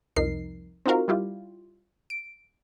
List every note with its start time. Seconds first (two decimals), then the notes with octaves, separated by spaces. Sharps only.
0.16 C2 F2 D#4 A#4 C7
0.86 C4 D#4 F4 F#4 A#4 F5
1.08 G3 E4 F4 G4
2.10 D7